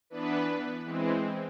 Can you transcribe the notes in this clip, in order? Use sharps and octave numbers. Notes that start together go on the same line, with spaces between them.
E3 B3 D4 B4
E3 G#3 C4